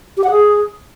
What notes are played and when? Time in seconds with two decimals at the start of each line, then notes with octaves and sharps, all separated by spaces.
0.17 G4
0.24 F#5
0.31 G#4